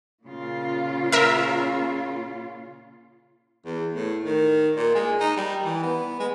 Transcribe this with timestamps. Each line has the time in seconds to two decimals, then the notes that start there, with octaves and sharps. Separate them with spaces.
0.24 A#2 C#3 F4
1.12 A#4 E5
3.65 E2
3.95 A2
4.24 D#3
4.76 A#2
4.95 G#3
5.20 D#4
5.37 G3
5.64 E3
5.83 B3
6.20 G#3